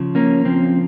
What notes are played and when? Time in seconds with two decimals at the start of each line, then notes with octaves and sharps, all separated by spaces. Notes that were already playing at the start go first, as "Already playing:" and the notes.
Already playing: C#3 F3
0.15 A#3 C#4
0.44 C#3 F3 C4